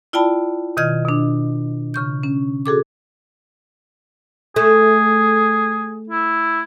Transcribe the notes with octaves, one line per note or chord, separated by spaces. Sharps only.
E4 F4 D5 G5 A5 B5
B2 D#3 D#5 F6 G#6
B2 D4
C#3 C#6 G6
C#4
F#4 G#4 A4 D6
A3 G#4
E4